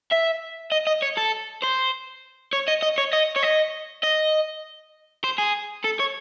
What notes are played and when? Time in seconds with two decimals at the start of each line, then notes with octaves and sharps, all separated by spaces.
0.11 E5
0.72 D#5
0.87 D#5
1.02 C#5
1.17 A4
1.62 C5
2.53 C#5
2.68 D#5
2.82 D#5
2.98 C#5
3.13 D#5
3.36 C#5
3.43 D#5
4.04 D#5
5.24 C5
5.38 G#4
5.84 A4
5.99 C#5